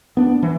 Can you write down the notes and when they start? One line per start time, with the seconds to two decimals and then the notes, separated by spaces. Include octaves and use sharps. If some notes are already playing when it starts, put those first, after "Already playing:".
0.17 B3 D4
0.42 E3